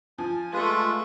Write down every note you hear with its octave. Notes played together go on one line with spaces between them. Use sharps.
F3 G#5
G#3 A3 F4 G#4 B4